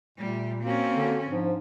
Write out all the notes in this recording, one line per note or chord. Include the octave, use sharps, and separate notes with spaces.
A#2 G3 A3
A#3 C4 C#4 F#4
D3
G#2 F3 D4